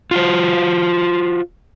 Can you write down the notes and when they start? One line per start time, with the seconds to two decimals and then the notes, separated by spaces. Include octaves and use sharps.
0.11 F4 F#4 C5